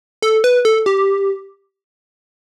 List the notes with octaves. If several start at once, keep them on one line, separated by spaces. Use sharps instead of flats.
A4
B4
A4
G4